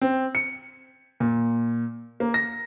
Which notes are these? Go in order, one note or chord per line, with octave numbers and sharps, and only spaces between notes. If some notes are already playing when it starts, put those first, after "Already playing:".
C4
C#7
A#2
A#3
A#6